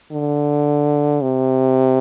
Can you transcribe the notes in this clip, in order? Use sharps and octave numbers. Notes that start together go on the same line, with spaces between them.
D3
C3